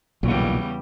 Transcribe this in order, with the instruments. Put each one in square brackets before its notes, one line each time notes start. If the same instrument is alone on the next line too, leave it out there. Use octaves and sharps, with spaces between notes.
[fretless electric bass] B1 A#2 [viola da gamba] E2 C#3 G3